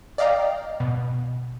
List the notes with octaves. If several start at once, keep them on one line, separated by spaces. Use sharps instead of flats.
D5 D#5 F5 G5 A#5
B2